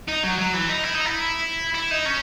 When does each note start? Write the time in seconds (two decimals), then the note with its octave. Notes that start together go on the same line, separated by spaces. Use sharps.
0.08 D#4
0.23 F#3
0.38 F#3
0.54 E3
0.69 D#4
0.83 E4
0.94 D#4
1.06 E4
1.75 E4
1.91 D#4
2.06 C#4